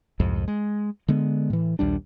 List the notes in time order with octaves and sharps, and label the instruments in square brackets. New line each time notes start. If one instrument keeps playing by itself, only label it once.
[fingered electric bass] C2 F2 G#2
G#3
D3 G#3 B3
A2 E3
A#1 D#2 G3 D4